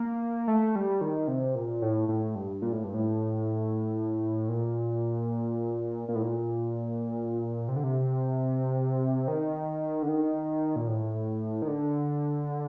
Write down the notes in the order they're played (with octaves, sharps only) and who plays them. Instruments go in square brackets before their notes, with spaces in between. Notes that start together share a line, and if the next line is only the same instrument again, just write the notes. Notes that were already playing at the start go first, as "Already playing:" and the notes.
Already playing: [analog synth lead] A#3
A3
G3
D#3
C3
A#2
A2
A2
G2
A#2
A2
G2
A2
A#2
A#2
A2
A#2
C3
D3
C3
D#3
D3
D#3
A#2
A2
D#3
D3